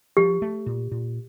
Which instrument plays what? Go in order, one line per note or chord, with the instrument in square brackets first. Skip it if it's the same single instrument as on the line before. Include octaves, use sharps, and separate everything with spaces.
[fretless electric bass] F3 [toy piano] G4
[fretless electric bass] A3
A#2
A#2